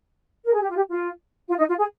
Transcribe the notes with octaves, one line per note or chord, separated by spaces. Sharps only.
A#4
G#4
G4
F4
G4
F4
F4
D#4
F4
G#4